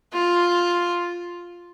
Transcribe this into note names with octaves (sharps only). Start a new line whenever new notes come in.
F4